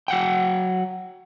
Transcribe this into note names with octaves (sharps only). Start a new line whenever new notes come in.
F#3 F#5 G5